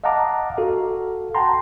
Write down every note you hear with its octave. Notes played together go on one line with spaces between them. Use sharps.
D#5 F5 F#5 A5 A#5 D6
F#4 A4 F5
F#5 G5 A5 A#5 C6